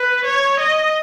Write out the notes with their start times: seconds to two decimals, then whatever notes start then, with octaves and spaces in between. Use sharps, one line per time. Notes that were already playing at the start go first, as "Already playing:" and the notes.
Already playing: B4
0.25 C#5
0.60 D#5